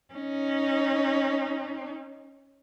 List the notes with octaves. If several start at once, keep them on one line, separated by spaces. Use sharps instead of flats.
C#4 D#4